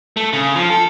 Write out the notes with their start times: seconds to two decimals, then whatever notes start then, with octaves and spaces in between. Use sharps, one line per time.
0.17 A3
0.33 C#3
0.55 F3
0.70 A4